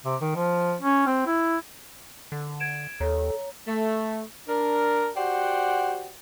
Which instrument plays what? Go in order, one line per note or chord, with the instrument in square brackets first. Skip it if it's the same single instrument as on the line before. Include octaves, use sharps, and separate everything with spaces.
[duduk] C3
D#3
F3
C#4
C4
E4
[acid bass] D3
[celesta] G#6 D7 E7
[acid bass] D#2 [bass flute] A4 [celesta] C#5 A#5
[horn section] A3
D4 A#4
F#4 G4 C5 D5 F#5 G5